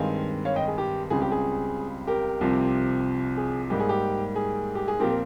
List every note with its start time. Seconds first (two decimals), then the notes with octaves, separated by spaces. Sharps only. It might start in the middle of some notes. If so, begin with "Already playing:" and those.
Already playing: G2 D#3 G#3 C4 F5 G#5
0.45 C#5 F5
0.56 D#5 G5
0.68 G#4
0.78 G4
1.10 C#2 C#3 G3 C4 G#4
1.21 G4
1.32 G#4
2.07 G4 A#4
2.41 C2 C3 F3 C4
3.37 G#4
3.70 G#2 G3 A#3 G4
3.80 G#4
3.89 G4
4.36 G#4
4.75 G4
4.88 G#4
5.00 A#2 F3 C4 G4 A#4
5.10 A#4